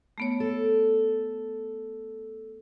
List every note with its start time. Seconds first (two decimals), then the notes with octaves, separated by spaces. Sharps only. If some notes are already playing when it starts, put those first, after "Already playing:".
0.18 A3 B3 C#5
0.40 A4